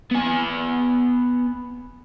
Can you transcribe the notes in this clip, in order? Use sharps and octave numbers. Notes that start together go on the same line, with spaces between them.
B3 G#5